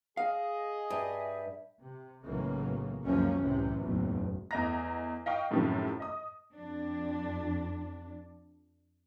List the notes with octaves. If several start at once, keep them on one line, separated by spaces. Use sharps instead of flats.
G#4 D#5 F5
G2 E5
C3
B1 A2 C#3 E3 F#3 A#3
C#2 F#2 C3 F3 A#3 C#4
C2 F#2 A2 C3 E3
F#1 B1 E2 A2
E2 A3 D#5 A#5 A#6
D#5 F5 G5 C#6
F#2 A2 C3 D#3 F3
D#5 D#6
F2 D4